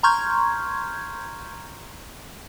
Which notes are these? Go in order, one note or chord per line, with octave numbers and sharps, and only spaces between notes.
A#5 C6 C#6 F6 G6 G#6